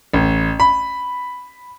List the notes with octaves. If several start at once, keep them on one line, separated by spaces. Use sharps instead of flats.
A1
B5